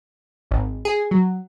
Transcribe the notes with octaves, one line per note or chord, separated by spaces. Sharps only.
G#1
G#4
F#3